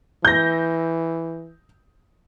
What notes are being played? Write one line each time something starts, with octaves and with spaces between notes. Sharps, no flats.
E3 G6 A#6